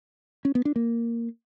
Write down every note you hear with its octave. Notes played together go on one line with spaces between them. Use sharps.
C#4
B3
D4
A#3